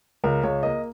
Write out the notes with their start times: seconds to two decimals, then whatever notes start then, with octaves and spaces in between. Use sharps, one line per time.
0.24 C#2 A#4
0.43 C#2 C#5
0.63 A#3 D#5